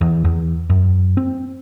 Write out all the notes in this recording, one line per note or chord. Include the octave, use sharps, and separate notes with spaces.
E2
E2
F#2
C4